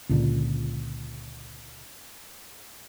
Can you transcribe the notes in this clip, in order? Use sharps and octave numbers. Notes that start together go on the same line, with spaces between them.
C#2 A#2 D3